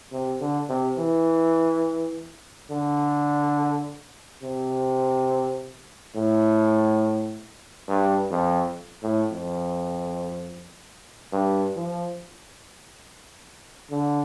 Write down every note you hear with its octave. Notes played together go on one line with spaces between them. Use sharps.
C3
D3
C3
E3
D3
C3
A2
G2
F2
A2
F2
G2
F3
D3